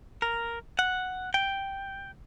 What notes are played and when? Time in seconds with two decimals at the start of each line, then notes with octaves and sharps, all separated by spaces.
0.22 A#4
0.79 F#5
1.34 G5